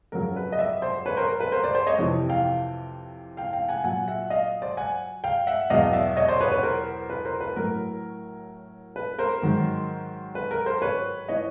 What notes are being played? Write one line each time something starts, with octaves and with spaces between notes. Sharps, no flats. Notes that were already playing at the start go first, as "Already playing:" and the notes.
F2 C#3 F#3 A#4
B4
D#5
D5 E5
C5 D5
B4 C#5
A#4 C5
A#4
B4
A#4 C5
C5 D5
C5 D5
C#5 D#5
F2 C3 E3
F5 G5
F5 G5
F5 G5
F#5 G#5
A#2 F#3 F#5 G#5
E5 F#5
D#5 F5
C5 D5
F#5 G#5
F5 G5
E5 F#5
E2 B2 F#3 D#5 F5
D5 E5
C#5 D#5
C5 D5
B4 C#5
B4 C#5
A#4 C5
B4
A#4 C5
B4
A2 F#3 A#4
B4
A#4 C5
G#2 D#3 F#3
B4
A#4
A#4 C5
B4 C#5
E3 C#5 D#5